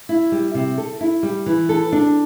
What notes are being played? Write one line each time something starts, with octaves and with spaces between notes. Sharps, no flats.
E4
G3
C3
A4
E4
G3
E3
A4
D4